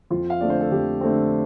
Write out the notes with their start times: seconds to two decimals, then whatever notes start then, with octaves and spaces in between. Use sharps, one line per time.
0.10 F2 F4
0.30 F5
0.41 D3 A3 C4 D5
0.50 C5
0.61 A4
0.72 F2 G4
1.01 D3 A3 C4